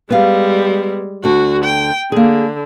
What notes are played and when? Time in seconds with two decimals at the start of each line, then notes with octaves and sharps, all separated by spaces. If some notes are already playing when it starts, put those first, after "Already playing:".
0.10 G3 G#3 B3 F5
1.24 D2 D3 F#4
1.64 G5
2.12 D3 A#3 G#4